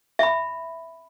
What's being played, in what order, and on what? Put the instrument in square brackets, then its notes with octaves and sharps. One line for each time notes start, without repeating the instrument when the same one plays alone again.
[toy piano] E5 B5